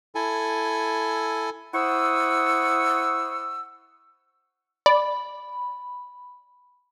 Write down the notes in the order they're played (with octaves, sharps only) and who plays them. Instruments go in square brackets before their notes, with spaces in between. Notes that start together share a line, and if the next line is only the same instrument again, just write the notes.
[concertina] E4 A4 G#5
[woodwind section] E4 C5 F#5 C#6 D#6 E6
[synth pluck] D5 [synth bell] B5